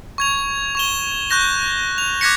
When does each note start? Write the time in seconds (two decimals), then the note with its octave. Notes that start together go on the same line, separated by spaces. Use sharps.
0.18 C#6 G#6 F7
0.75 C#6 E7 G7
1.30 C#6 F#6 G6 A#6 G7
1.98 F7
2.21 D6 F#6 G#6 A#6 B6 C#7